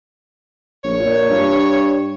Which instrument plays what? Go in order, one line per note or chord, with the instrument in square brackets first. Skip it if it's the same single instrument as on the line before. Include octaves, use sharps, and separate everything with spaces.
[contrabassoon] A#1 [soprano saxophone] C#5
[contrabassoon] A#2
G2